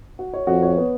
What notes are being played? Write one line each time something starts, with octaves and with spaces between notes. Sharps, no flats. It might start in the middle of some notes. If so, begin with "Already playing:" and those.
F#4
C#5
F2 F#4
C#5
B3